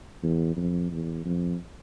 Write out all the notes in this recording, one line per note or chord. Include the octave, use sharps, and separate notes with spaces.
E2
F2
E2
F2